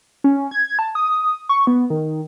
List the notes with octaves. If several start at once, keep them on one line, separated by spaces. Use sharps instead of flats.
C#4
G#6
A5
D#6
C#6
B3
D#3